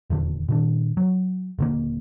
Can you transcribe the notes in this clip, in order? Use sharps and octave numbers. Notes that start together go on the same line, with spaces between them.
D#1 E2 D3
A#2 D#3 D4
F#3
D#1 D3 A#3